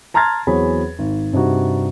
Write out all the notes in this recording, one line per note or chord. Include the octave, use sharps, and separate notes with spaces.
A5 A#5 C6 F6 G#6 A6
E2 F#3 C4 G#4 C#5 B5
G#1
G2 C3 D#4 F#4